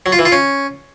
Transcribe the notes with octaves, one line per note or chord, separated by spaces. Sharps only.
F#3
F4
E3
F4
C#4